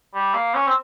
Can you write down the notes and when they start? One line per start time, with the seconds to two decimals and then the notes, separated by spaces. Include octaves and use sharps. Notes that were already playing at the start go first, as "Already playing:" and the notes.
0.15 G3
0.34 A#3
0.54 C#4
0.68 C4